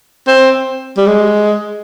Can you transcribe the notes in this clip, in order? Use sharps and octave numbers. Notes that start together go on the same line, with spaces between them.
C4
G3
G#3